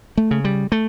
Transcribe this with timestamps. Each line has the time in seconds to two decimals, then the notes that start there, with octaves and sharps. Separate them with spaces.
0.17 A3
0.31 C#3
0.45 G3
0.72 A3